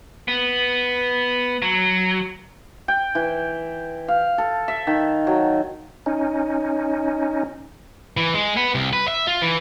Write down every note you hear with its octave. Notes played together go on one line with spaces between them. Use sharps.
B3
F#3
G5
E3
F5
A4
E5
D#3
F#3
C#4 D#4
E3
G#3
B3
C2
B4
E5
F4
E3